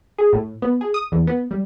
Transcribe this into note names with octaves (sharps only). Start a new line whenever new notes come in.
G#4
A2
B3
G#4
D#6
E2
B3
G3